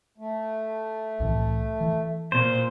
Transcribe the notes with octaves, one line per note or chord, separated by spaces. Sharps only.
A3
C2 A2 E3
E3
A#2 C5